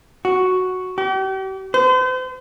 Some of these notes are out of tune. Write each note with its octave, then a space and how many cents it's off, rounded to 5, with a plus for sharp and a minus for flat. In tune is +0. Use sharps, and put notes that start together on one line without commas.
F#4 +0
G4 -40
C5 -40